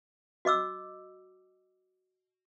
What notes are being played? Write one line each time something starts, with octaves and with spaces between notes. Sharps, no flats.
F#4 D#5 D6 E6